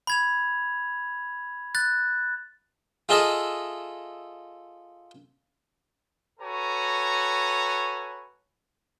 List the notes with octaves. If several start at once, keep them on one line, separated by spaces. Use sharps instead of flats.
B5 G#6 F7
F#6 A6
F4 G#4 A4 D#5 E5
F#4 A4 B4 C#5 G#5 A#5